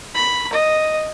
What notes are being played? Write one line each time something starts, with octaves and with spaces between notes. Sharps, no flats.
B5
D#5